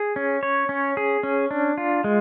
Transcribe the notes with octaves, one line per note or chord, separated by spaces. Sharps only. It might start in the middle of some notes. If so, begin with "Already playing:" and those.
Already playing: G#4
C#4
C#5
C#4
G#4
C#4
D4
F4
G#3